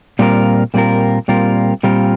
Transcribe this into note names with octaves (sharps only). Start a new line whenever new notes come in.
A#2 G3 C4 F4 A#4
A#2 G3 C4 F4 A#4
A#2 G3 C4 F4 A#4
A#2 G3 C4 F4 A#4